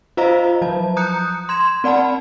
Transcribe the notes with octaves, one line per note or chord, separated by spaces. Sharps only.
F4 C5 D#5 F5 A#5
F3 F#3 A5
A#5 D#6 F#6 G6 C#7
C6 G#6 E7
C4 D5 F#5 A5 B5